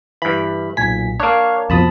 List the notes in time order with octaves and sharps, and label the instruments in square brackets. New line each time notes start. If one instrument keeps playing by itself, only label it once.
[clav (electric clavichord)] G2 E3 [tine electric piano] B5
[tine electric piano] B1 A#2 B6 [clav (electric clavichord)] G#5
[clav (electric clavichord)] A#3 D4 [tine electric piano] C#5 F5
[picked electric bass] F2 B2 F3 [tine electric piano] A5 B5 D#6